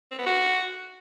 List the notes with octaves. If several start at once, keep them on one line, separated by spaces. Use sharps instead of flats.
C4
B3
F#4